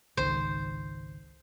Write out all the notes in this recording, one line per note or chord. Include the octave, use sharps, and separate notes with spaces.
G#1 C#2 D#3 C5